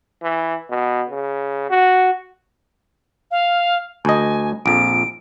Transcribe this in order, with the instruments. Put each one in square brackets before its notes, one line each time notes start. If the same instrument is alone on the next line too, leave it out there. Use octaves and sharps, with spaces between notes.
[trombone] E3
B2
C#3
F#4
[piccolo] F5
[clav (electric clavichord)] D2 D#5 [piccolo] G#5
[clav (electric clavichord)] A#1 F2 [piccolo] D7